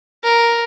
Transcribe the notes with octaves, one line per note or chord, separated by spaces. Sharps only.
A#4